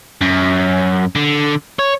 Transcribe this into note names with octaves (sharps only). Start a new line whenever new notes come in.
F#2
D3
C#5